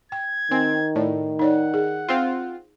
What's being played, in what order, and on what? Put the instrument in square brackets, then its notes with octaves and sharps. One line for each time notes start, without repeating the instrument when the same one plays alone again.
[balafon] G5 [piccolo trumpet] G#6
[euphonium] D#3 [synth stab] C4 [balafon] G#5
[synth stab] A2 [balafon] D5
[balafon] D#4 C#5 D5 [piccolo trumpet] F#5
[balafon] G#4
[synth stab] C4 F4